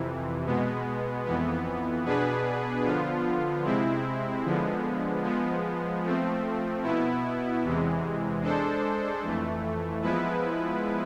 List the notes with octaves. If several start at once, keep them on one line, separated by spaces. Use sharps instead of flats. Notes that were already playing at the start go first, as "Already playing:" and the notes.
Already playing: F2 C3 E3
B2 G#3 B3
F2 E3 B3
B2 B3 D4 G#4 B4
D3 F3 B3 F4
C3 G#3 C4 E4
D3 F3 G#3 B3
F3 G#3 B3
F3 A3 C4
B2 B3 E4
E2 C3 E3 G#3
G#3 D4 A4 C5
F2 E3 A3
F3 G#3 B3 E4 B4